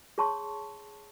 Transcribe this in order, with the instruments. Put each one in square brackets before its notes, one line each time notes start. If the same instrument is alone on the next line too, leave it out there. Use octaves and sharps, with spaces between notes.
[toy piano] G#4 C#5 A5 C6 C#6